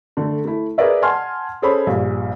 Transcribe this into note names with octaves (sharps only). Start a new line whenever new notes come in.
D3 A3
A3 E4
G#4 A#4 B4 D5 E5
F#5 G#5 A5 C6 F6
C#4 G#4 A4 C5 C#5 B5
A#1 G2 A#2